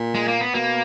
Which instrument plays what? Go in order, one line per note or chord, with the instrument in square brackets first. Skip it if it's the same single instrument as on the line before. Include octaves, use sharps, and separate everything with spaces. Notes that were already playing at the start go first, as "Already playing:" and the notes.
Already playing: [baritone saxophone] A#2
[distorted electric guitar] G#3
A#3
B3
[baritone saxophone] B2 [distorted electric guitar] A#3